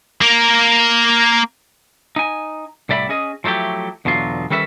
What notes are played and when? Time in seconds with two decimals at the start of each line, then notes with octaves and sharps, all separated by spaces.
0.22 A#3 A#4
2.16 D#4 G#5
2.89 C2 A2 D5 E5 A#5 B5
3.09 C#4 G#4 D#5
3.44 F3 F#3 A3 E4 G4
4.05 E2 B2 D3 F#3 F4
4.50 D#3 G3 C#4 A4 B4 E5